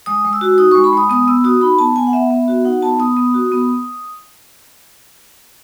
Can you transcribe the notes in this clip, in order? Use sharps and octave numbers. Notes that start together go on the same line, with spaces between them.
G#3 D#6
G#3
E6
F#4
D#4 D#6
G#3 C#6
B5
G#3 D#6
B3 D#6
B3 E6
F#4 D#6
D#4 B5
B3 A5
B3 G#5
F#5
B3 E5
B3
F#4
D#4 F#5
B3 A5
B3 D#6
B3 D#6
F#4
B3